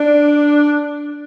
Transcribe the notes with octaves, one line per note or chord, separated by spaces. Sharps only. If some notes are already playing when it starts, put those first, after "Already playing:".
Already playing: D4